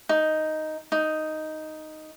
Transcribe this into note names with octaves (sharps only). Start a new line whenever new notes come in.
D#4
D#4